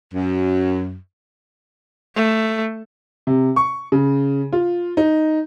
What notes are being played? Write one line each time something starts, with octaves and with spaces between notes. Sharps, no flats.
F#2
A3
C3
C#6
C#3
F4
D#4